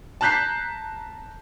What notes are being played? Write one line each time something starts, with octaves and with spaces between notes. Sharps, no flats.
A5 A#5 F#6 G6 B6 C7